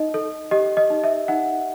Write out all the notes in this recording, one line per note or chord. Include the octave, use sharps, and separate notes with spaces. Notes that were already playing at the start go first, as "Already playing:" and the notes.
Already playing: D#4 D#5
A4
G4 D#5
D#5
D#4
E5
D#4 F#5